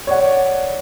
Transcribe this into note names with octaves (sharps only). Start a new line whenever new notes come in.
C#5 D5 F#5